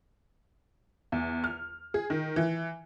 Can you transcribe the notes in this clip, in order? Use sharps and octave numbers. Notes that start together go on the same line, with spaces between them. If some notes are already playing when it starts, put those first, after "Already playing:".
E2
F6
G#4
D#3
E3